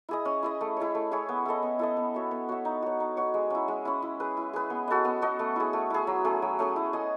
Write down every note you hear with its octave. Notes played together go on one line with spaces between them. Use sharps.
E4 G#4 D#5
C#4
E4 G#4 D#5
A3
E4 G#4 C#5
A3
E4 G#4 C#5
B3
E4 A4 D#5
B3
E4 A4 D#5
B3
F#4 C#5 E5
B3
F#4 C#5 E5
D#4
F#4 C#5
D#4
F#4 C#5
G#3
C#4 E4
G#3
C#4 E4
E4
G#4 B4
E4
G#4 B4
B3
F#4 A4 D#5
B3
F#4 A4 D#5
A3
E4 G#4
A3
E4 G#4
F#3
A3 C#4 G#4
F#3
A3 C#4 G#4
E4
G#4 D#5